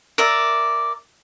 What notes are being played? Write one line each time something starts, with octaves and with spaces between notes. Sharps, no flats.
A#4 D5 E5